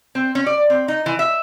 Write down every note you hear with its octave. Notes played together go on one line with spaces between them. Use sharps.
C4
C#4
D5
C4
D#4
E3
E5